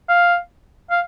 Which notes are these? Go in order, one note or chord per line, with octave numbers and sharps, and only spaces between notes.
F5
F5